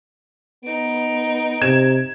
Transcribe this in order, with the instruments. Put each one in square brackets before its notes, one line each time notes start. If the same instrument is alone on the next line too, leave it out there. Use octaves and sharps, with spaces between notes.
[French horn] B3 [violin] D#4 D7
[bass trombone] C3 [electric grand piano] G#6 E7